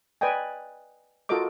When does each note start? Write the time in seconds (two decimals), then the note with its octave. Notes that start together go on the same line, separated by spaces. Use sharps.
0.21 B4 D5 D#5 G5 G#5
1.29 F4 F#4 A4 A#4 D#5 D6